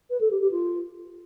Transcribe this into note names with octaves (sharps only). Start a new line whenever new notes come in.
B4
A4
G4
G4
F4